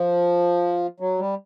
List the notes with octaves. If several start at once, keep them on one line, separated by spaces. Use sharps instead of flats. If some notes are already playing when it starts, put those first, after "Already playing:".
Already playing: F3
F#3
G3